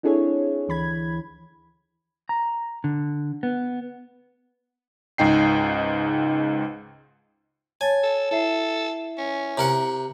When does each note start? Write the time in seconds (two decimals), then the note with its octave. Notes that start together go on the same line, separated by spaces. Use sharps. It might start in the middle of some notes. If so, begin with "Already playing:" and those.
0.03 C4 D4 E4 G#4 A4 C#5
0.68 D2 E3 B5 G#6
2.29 A#5
2.84 D3
3.43 B3
5.18 C#2 G#2 D#4 G5 C7
7.81 C#5 G#5 A5 A6
8.03 A4
8.31 E4 A4 E5 C7
9.18 C#4
9.57 C3 A#4 F#5